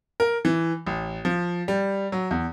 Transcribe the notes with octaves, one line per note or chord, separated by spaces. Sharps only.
A#4
E3
A1
F3
G3
F#3
E2